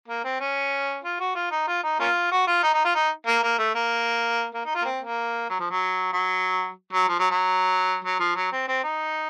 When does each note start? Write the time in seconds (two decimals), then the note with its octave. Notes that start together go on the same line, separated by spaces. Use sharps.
0.08 A#3
0.24 C4
0.40 C#4
1.04 F4
1.20 F#4
1.35 F4
1.51 D#4
1.67 F4
1.83 D#4
2.00 A#3 C#4 F4
2.31 F#4
2.47 F4
2.63 D#4
2.74 D#4
2.85 F4
2.95 D#4
3.27 A#3
3.43 A#3
3.59 A3
3.75 A#3
4.54 A#3
4.65 D#4
4.75 F4
4.82 A#3
4.85 C4
5.02 A#3
5.49 F#3
5.60 F3
5.71 F#3
6.13 F#3
6.93 F#3
7.09 F3
7.19 F#3
7.31 F#3
8.05 F#3
8.20 F3
8.36 F#3
8.52 C4
8.68 C4
8.83 D#4